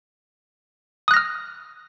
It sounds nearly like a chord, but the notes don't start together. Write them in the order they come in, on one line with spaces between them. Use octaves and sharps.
D#6 F#6 A#6 F6